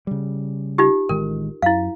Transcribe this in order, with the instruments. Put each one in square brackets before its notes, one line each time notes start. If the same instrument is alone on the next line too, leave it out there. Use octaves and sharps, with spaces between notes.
[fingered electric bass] C#3 G3
[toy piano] D#4 F4 G4
[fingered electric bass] A1 D#3 G#3 [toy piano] A#4
[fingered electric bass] F#2 [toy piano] E4 F5